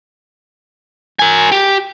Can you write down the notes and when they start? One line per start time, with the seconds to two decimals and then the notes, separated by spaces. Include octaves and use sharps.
1.19 A#4 G#5
1.52 G4